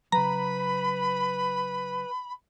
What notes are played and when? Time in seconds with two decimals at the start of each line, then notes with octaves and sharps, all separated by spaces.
0.12 C#3 F#3 B4 A#5 B5